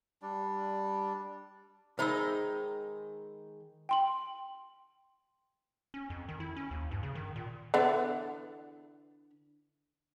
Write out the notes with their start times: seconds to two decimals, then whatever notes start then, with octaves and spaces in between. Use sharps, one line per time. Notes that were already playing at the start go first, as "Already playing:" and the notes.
0.22 G3 D4 D5
1.99 D#3 G#3 D#4 C5 B5 E6
3.89 G5 C6 F#7
5.94 C#4
6.10 F2
6.29 D#3
6.40 E4
6.56 C#4
6.71 D#2
6.91 G2
7.03 C#3
7.15 D#3
7.36 A#2
7.74 D3 E3 B3